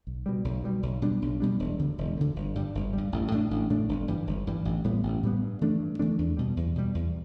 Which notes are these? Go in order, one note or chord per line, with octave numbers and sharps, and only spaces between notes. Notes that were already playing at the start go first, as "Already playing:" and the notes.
B1
B2 G3
B1
B2 G3
B1
B2 G3 D4
B1
B2 G3 D4
E1
D2 D3
E1
D2 D3
G1
G2 G3
G1
G2 G3
A1
A2 A3 D4
A1
A2 A3 D4
G1
G2 E3 G3
G1
G2 E3 G3
A1
A2 G3 B3
A1
A2 G3 B3
G2
E3 A3 D4
G2
E3 A3 D4
E2
B2 G3
E2
B2 G3
E2